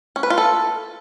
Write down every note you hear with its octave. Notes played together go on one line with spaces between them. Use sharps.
C#4
B4
F4
A4